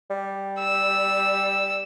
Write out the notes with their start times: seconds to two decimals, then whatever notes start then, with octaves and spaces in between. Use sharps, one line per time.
0.11 G3
0.59 E6